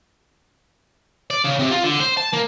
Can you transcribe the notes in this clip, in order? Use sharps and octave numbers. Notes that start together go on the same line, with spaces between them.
D5
C#3
C3
F4
D3
C5
A5
A#3